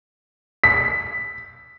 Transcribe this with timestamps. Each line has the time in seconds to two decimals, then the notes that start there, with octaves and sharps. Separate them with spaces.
0.64 B6